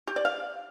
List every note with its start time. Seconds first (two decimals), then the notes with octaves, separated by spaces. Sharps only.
0.07 G4
0.16 D5
0.25 F5